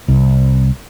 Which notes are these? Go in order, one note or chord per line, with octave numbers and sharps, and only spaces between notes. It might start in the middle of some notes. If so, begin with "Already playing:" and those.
C2